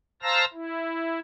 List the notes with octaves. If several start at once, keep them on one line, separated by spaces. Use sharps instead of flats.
C5 F5 A5 A#5 E6 A#6
E4